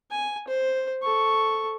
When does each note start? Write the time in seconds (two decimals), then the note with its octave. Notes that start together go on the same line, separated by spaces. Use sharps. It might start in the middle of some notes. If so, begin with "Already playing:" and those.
0.11 G#5
0.48 C5
1.02 A4 C#6